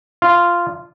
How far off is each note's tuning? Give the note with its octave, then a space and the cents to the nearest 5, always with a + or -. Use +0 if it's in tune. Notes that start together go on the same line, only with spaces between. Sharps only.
F4 -10